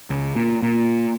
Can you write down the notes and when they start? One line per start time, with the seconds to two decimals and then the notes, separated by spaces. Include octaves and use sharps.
0.10 C#2
0.36 A#2
0.62 A#2